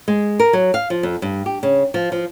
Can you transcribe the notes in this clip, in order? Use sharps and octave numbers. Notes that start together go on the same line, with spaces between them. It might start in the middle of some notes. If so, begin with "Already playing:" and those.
G#3
A#4
F#3
F5
F3
F2
G2
G4
C#3
F3
F3